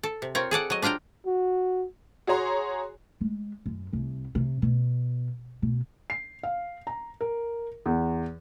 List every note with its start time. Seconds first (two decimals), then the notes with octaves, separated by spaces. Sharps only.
0.03 A4
0.22 C3
0.35 C4 F4 A#4 C#5
0.51 G#4 A4 D5 F#5
0.70 F#3 D#5
0.82 D4 F4 F5 G5 A#5
1.26 F#4
2.27 F#4 G#4 C#5 A#5 C6
3.21 G#3
3.66 F#2
3.93 C2 C3
4.35 C3
4.62 B2
5.62 B2
6.10 C7
6.43 F5
6.87 A#5
7.21 A#4
7.86 E2